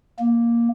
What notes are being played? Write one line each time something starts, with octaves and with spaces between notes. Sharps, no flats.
A#3